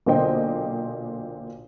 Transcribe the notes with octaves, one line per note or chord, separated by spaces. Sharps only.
B1 A#2 D3 C5 D#5 G5